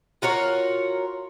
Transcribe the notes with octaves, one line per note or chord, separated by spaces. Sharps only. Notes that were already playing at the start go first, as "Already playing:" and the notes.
F4 F#4 A#4 C#5